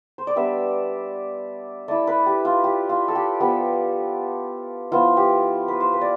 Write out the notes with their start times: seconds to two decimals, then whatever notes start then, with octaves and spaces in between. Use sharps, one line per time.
0.18 C5
0.27 D5
0.36 G3 B3 D4 E5
1.88 A3 E4 D5
2.07 B4
2.26 G4
2.45 F4
2.64 G4
2.89 F4
3.08 A4
3.15 G4
3.40 F3 B3 F4 G4
4.92 F3 B3 E4 F4
5.17 G4
5.68 B4
5.80 C5
5.93 B4
6.01 D5